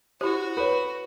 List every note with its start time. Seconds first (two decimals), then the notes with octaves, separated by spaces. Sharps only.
0.21 E4 F#4 G4 C5
0.57 A4 B4 C#5